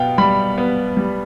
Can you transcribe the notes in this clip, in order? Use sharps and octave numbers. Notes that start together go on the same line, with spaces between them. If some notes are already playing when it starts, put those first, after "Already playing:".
Already playing: B2 B3 F5 G5
G3 B5
B3
G3